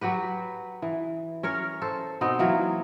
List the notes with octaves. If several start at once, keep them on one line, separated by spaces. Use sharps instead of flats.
F#3 F#4 G4 B4
E3
C#4 A#4 C#5
A4 C5
B2 B3 C4 D#4
E3 F#3 A#3